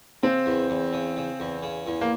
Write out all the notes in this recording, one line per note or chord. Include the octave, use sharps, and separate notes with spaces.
C#3 C4
E2
E2
C#3
C#3
E2
C#3
E2
A#3